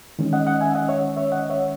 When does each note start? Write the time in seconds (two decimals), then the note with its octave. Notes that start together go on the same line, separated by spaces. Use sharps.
0.19 D#3 G#3 C#4
0.33 D#5 F#5
0.47 D#5 F#5
0.61 E5 G#5
0.75 D#5 F#5
0.88 C#5 E5
1.17 C#5 E5
1.32 D#5 F#5
1.50 C#5 E5